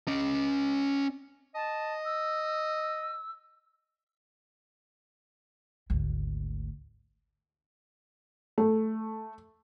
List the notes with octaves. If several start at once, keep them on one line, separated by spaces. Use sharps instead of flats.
C#4 D#5
D#5 A5
E6
G#1 D2
A3